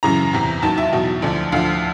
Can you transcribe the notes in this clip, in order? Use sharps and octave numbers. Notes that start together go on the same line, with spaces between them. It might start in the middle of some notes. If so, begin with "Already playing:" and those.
F#2 C#3 E3 A#5
E2 C3 E3
D#2 D#3 F#3 A5
E5
E2 B2 F#3
D2 D3 F3
D2 D3 F3 F5